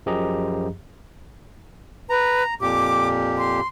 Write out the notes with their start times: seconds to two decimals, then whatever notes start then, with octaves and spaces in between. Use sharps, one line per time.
0.06 F#2 F3 G4 G#4 D#5 A#5
2.10 B4 A#5
2.61 F2 A#2 G4 D6
3.38 C6